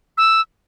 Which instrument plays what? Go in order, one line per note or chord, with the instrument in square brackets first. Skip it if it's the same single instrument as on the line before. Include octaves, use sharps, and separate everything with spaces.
[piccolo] E6